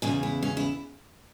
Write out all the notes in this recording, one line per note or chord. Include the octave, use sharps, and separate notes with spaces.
E2 C#3 E3 G#4
E4
C#4
E4